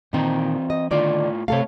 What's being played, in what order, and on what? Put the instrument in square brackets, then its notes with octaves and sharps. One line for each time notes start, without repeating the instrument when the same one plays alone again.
[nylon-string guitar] A#2 D#3 [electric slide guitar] E3 C4 C5
[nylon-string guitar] D#5
[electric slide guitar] A2 F4 [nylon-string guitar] D3 D#3 D5
[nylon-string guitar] C3 A4 F5 [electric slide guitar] A3 C#5